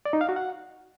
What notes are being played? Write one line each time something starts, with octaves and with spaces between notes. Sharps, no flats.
D5
D#4
F5
F#4
F#5